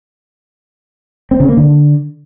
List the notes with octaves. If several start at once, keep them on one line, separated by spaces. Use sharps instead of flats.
C4
C#3
A#3
D3